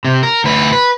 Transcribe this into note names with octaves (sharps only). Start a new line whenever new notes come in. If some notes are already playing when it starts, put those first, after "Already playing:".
C3
A#4
D2 B4
B4